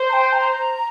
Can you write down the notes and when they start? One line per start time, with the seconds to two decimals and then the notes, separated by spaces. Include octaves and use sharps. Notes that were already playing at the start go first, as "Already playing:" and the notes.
Already playing: C5
0.09 A#5
0.13 G5
0.33 A#5